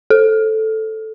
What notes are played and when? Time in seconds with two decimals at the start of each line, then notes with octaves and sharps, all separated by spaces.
0.10 A4